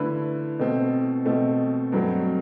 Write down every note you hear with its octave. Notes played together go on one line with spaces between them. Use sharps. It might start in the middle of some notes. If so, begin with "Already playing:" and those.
Already playing: D3 A3 E4 B4
B2 A3 C4
B2 A3 C4
G2 F#3 A3 C4